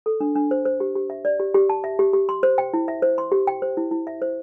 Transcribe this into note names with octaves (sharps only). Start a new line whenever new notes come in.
A4
D4
D4
C5
C5
G4
G4
E5
D5
G4
G4
A5
E5
G4
G4
C6
C5
G5
E4
E5
C5
C6
G4
G5
C5
E4
E4
E5
C5